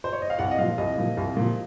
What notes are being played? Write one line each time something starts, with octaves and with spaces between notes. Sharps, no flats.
C5
C#5
D#5
F5
C2 F#5
D#5
A#2 F3 F5
C2 D#5
A#2 F3
C2
A#2 F3